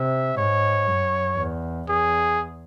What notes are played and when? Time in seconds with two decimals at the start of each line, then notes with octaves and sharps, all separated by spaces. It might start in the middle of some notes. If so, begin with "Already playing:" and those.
Already playing: C3 E5
0.37 G#2 C#5
0.87 F#2
1.38 E2
1.89 E2 G#4